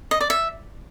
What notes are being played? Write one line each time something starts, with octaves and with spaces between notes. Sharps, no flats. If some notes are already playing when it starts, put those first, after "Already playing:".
D#5
D5
E5